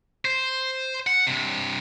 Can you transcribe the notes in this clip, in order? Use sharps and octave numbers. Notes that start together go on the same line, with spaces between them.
C5
F#5
G2 C3